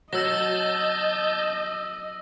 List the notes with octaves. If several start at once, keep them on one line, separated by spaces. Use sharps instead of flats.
F#3 C#5 D#5 A5 E6 G6 A#6